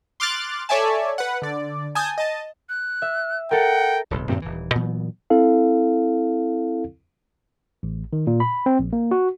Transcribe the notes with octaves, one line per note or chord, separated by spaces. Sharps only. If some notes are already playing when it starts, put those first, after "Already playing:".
C6 D6 F6 F#6 A6
A4 C#5 D5 E5 G#5 A5
B4 F#5
D3 D5
G#5 A5 D#6 G6
D#5 A5
F#6
E5
A4 A#4 F#5 G5
D1 B1
F#2 A#2 D#3 C4
D#1 E3
A#2 E3 F#3 B3
C4 E4 A4 F5
A1
D#3
A#2
B5
C4
A#1
A#3
F#4